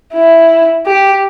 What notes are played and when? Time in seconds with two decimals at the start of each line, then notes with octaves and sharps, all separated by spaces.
0.13 E4
0.86 G4